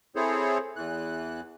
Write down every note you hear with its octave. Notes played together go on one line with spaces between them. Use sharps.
C4 E4 G#4 A4 C5 C#5
E2 E3 F#6